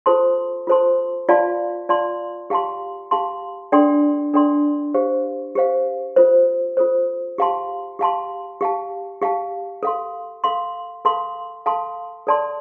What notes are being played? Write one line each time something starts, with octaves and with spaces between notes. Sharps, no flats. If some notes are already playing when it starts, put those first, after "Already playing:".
F4 A4 C5 A5 C6
F4 A4 C5 A5 C6
F4 D5 F5 A5 C6
F4 D5 F5 A5 C6
G4 F5 A5 C6
G4 F5 A5 C6
D4 A4 D5 G5 C6
D4 A4 D5 G5 C6
G4 C5 F5
G4 C5 F5
F4 A4 C5
F4 A4 C5
G4 F5 A5 C6
G4 F5 A5 C6
G4 F5 A5
G4 F5 A5
A4 F5 C6
A4 F5 C6
A4 F5 A5 C6
A4 F5 A5 C6
A4 D5 A5 C6